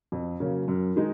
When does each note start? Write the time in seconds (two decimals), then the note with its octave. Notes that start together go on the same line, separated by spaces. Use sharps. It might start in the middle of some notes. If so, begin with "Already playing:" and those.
0.12 F2
0.40 C#3 F#3 A#3 C#4
0.68 F#2
0.96 D#3 G#3 D#4